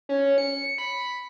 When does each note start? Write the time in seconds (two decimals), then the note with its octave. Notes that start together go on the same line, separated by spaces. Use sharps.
0.09 C#4
0.38 C#7
0.78 B5